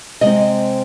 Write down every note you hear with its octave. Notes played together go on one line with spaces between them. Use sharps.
C3 G#3 C4 D#5